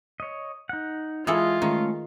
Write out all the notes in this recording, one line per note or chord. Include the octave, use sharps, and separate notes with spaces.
C#5 D#5
D#4 F#5
E3 G#3 F4 G#4 A4
D#3 G#3 A3 C#4